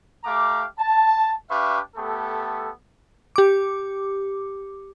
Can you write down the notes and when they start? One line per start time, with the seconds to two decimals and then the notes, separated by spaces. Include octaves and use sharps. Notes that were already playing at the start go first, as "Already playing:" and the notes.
0.25 A3 G4 F5 A#5 D6
0.78 A5
1.49 D4 G4 B4 E5 F5 C#6
1.96 A3 B3 G4 A4
3.36 G4 D6